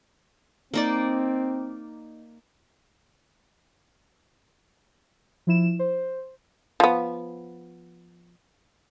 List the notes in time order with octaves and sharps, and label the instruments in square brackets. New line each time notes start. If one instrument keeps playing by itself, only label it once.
[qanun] A#3 D#4 D5 [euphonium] C4
[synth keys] F3 E4 E7
C5
[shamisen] F3 B3